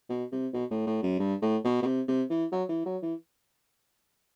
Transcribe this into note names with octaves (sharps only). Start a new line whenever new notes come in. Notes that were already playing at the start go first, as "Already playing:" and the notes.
B2
C3
B2
A2
A2
F#2
G2
A2
B2
B2
C3
C3
E3
F#3
E3
F#3
E3